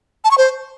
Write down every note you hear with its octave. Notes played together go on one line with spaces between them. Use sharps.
A5
C#6
C5